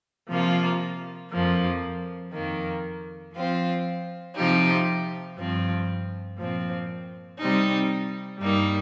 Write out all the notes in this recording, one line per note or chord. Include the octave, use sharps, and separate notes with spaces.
C3 F3 A#3 F4
F2 F3 A#3
F2 D#3 A#3
F3 C4 F4
C3 F3 D#4 G4
G2 F3 C4
A#2 F3 C4
C3 G3 C4 D#4
G2 G3 A#3 D#4